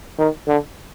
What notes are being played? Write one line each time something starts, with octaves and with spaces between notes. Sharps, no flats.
D#3
D3